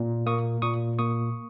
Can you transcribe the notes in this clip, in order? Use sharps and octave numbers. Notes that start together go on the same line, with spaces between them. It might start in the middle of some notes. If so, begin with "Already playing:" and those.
Already playing: A#2
A#3 C#6 D#6
A#2 C#6 D#6
A#3 C#6 D#6